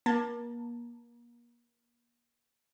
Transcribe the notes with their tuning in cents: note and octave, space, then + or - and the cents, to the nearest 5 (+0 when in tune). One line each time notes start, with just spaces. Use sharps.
A#3 +30 A5 +15